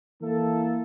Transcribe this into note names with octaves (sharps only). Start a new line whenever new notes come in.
E3 A#3 E4 A4